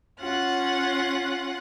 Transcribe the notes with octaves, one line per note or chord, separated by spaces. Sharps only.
C#4 F4 F#5 F#6